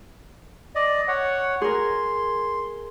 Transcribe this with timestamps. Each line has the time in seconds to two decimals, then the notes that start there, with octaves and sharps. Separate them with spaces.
0.75 D5 D#5
1.08 C#5 F#5
1.61 G#4 A#4 C6